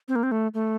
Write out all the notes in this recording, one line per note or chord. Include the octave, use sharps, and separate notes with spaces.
C4
A#3
C4
A3
A3